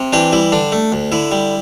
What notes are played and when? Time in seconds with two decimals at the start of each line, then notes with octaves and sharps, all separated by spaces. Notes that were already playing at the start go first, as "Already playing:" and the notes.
Already playing: C3
0.13 E3 D4 G4
0.33 G3 E4
0.52 D3 D4
0.72 A3
0.92 D2
1.12 D3 E4
1.32 G3